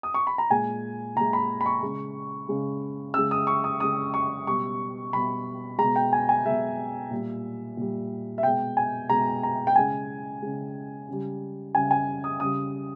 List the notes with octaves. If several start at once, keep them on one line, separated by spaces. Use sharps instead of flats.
D#6
C#6
B5
A#5
A#2 G#3 G#5
A#2 G#3 A#5
B5
B5
C#6
C#3 G#3
C#3 G#3
C#3 G#3 E6
D#6
C#6
D#6
C#3 G#3 D#6
C#6
B2 G3 C#6
B2 G3 B5
B2 G#3 A#5
G5
G#5
G#5
B2 G#3 E5
A#2 G3
A#2 G3
E5
B2 G#3 G5
G#5
B2 G#3 A#5
A#5
G5
C#3 G#3 G#5
C#3 G#3
C#3 G3
C#3 G3 G#5
G#5
D#6
C#3 G3 D#6